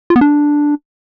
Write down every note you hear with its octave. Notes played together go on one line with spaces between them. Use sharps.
F4
B3
D4